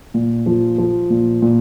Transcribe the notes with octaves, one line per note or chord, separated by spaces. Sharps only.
A#2
F3
F3
A#2
A#2